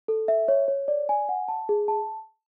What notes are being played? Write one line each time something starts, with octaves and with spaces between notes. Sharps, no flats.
A4
E5
C#5
C#5
D5
G#5
F#5
A5
G#4
A5